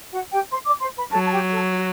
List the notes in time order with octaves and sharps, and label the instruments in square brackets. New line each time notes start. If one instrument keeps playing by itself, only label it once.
[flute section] F#4 F#5
G4 G5
C5 C6
D5 D6
C5 C6
B4 B5
[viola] F#3 [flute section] A4 A5
[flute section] A5
G4 G5
A4
F#4